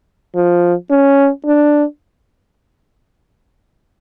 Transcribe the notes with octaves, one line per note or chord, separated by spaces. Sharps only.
F3
C#4
D4